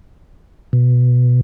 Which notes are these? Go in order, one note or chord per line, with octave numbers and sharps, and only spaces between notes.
B2